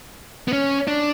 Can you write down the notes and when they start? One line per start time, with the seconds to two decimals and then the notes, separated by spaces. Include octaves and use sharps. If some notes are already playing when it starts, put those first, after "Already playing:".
0.48 B3
0.53 C#4
0.88 D4